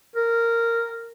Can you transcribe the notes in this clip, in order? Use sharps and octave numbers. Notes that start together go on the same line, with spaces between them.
A#4